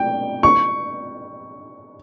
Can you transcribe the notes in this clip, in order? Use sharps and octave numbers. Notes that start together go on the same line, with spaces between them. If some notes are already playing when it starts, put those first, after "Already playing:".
Already playing: G5
C#6